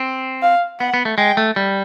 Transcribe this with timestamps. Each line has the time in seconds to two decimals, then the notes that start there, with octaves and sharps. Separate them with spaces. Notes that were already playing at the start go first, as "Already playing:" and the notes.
Already playing: C4
0.42 F5
0.80 B3 F#5
0.94 B3
1.05 A3
1.18 G#3 G5
1.37 A3
1.56 G3